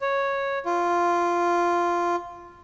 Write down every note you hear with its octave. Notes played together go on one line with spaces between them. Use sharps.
C#5
F4